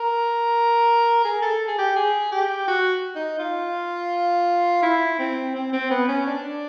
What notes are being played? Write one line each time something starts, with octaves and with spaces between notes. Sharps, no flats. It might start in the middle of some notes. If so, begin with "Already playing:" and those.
Already playing: A#4
G#4
A4
G#4
G4
G#4
G4
F#4
D#4
F4
E4
C4
C4
C4
B3
C#4
D4